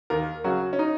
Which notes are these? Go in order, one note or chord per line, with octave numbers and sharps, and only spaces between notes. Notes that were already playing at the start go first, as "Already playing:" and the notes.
D#2 A#4
C#3 F#3 F#4
C#4
D#4